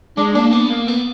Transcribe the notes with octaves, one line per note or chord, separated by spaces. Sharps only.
G#3 D4
A#3 D4
B3
A#3
B3